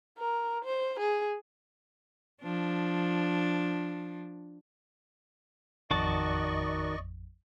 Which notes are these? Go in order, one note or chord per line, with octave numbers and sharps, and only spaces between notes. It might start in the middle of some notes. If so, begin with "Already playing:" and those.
A#4
C5
G#4
F3 D4
A1 F2 D#3 F#4 D5 D#5 A5 C#6